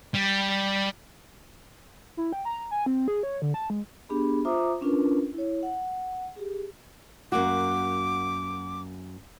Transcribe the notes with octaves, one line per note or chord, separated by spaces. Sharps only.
G3
E4
G5
A#5
G#5
C4
G#4
C#5
D3
A5
G#3
B3 D4 G4 G#4 B5
F4 C5 E5 A#5 D6 D#6
C#4 D4 F4 A#4 B4
E4 C#5
F#5
G4 G#4
F#2 A#3 F#4 D6